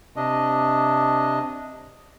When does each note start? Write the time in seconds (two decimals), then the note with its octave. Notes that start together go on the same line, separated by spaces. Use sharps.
0.16 C3 D4 D#5